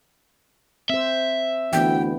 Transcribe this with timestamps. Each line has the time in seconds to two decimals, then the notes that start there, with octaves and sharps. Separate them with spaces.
0.90 C4 C5 E5
1.73 D2 E3 B3 G5